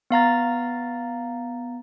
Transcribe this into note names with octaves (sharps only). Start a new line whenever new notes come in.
B3 F5 A#5 A6